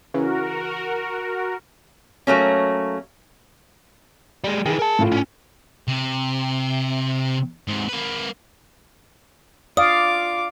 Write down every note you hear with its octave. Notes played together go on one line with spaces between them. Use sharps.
C#3 E3 F#4 A#4
F#3 A3 A#3 C#4
G3 G#3
D#3 E3 G#4
A#4 A5
A2 F4
C#4 D4
C3
G#2 C3
A#3 B4
F4 D5 F5 D6 D#6